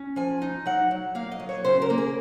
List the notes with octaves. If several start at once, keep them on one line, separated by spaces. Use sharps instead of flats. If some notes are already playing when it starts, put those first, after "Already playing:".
Already playing: C#4
F3 G#5
D#4
F#3 F#5
F#3
A#3 F5
D#5
F#3
C#5
C#3 C5
A#4
A#3
G#4